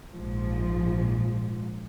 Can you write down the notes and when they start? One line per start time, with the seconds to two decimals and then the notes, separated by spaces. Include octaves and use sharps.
0.13 A#1 G#2 F3